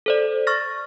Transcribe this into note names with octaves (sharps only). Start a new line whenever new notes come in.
A4 C5 D5
C#6 F6 A6 A#6